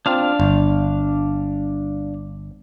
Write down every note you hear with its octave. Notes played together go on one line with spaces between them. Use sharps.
C4 D4 F4 F5
G1